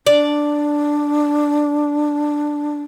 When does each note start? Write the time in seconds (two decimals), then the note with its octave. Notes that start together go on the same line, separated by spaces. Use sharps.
0.07 D4 D5